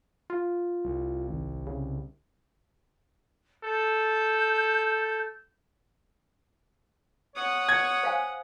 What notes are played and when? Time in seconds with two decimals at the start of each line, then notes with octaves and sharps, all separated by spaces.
0.30 F4
0.85 C2
1.29 G#1
1.67 C#3
3.64 A4 G6
7.35 C#5 F#5 D#6
7.69 G#6
8.03 C5 F5 G#5